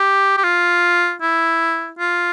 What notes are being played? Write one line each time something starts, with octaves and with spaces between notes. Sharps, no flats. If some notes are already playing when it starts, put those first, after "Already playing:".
Already playing: G4
G4
F4
E4
F4